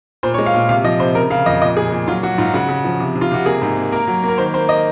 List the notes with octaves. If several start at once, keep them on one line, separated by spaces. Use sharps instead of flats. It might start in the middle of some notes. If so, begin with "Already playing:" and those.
A#2 C5
C#5
G#3
F5
A#2
C3 F5
F3 D#5
C3 C5
C#3 A#4
C#3 F5
F2 D#5
A#2 D#5
A#2 G#4
A#2
F#3 F4
F#3 F#4
G#2 F4
C#3 F#4
C#3
F3
C3
C3
F4
C3 F#4
A#3 G#4
G#2
A#3
A#3 A#4
F#3
A#3 A#4
D#3 C5
A#3 C5
D#5